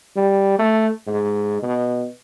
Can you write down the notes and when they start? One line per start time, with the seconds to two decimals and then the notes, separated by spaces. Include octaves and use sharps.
0.16 G3
0.59 A3
1.07 G#2
1.63 B2